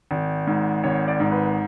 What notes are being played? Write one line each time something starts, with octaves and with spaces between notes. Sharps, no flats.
G#1
G#2
G#1 C#5
D5
G#2
B4